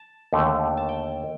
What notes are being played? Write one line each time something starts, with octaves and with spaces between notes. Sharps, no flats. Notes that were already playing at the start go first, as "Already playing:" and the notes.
Already playing: A5
D#2 D3 A3
A5
G5